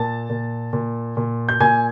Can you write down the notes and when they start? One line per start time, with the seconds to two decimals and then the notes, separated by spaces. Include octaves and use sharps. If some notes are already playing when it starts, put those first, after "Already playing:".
Already playing: A#2 A5 A6
0.30 A#2
0.73 A#2
1.17 A#2
1.49 G6
1.60 A#2 G#5 G#6